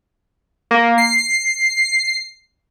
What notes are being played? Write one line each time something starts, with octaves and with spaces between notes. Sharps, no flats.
A#3
C7